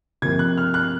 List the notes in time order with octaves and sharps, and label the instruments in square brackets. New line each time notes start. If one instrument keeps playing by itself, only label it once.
[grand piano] C3 F3 A#3 [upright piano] G#6
[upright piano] F#6
F6
F#6